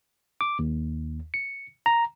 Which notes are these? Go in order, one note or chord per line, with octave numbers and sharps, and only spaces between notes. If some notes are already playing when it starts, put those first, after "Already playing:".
D6
D#2
C#7
A#5